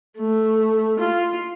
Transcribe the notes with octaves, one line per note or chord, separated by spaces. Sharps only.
A3
F4